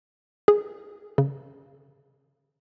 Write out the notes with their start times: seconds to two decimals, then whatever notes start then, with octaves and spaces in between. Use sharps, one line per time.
0.48 G#4
1.18 C#3